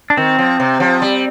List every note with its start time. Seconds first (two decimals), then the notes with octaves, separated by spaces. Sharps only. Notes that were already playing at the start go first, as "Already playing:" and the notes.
0.10 D4
0.17 D#3 C4
0.38 F3
0.60 C3
0.80 F3
1.02 G3